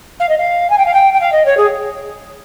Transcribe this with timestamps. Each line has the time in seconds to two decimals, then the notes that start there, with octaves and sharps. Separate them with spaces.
0.20 F5
0.29 D#5
0.38 F5
0.70 G#5
0.78 G5
0.86 F5
0.94 G5
1.14 G5
1.20 F5
1.32 D#5
1.45 C#5
1.57 G#4